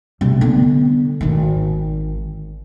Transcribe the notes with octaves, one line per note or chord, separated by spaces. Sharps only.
C3 G3
D3 B3
G#1 D#3